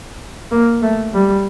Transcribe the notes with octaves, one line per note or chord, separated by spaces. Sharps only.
A#3
A3
G3